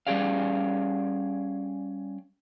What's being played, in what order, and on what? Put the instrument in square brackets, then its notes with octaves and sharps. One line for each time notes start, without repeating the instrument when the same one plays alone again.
[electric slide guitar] G3 C#4 G4 G#4 D5 F5